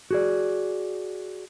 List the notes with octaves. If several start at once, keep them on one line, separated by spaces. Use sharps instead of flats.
F#4 G#4 D5